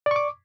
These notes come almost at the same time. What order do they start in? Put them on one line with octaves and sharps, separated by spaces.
D5 C#6 D6